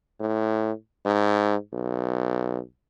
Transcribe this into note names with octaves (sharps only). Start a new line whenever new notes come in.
A2
G#2
B1